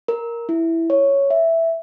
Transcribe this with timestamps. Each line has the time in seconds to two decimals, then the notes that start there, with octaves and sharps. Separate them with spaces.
0.08 A#4
0.49 E4
0.90 C#5
1.30 E5